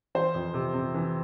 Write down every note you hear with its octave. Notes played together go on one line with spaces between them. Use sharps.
E3 C5
F2
C3
C3
E3